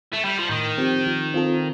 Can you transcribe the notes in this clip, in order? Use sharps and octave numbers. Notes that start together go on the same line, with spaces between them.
A3
G3
F3
A2 D#3
F3 C4 G4
F3
C4 F4 A4